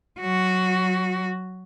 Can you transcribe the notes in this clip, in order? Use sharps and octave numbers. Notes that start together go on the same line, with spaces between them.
F#3 F#4